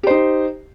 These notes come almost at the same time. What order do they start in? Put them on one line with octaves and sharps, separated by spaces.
G4 C5 D#4